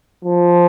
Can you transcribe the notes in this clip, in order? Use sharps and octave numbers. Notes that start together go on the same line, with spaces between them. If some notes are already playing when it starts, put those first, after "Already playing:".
F3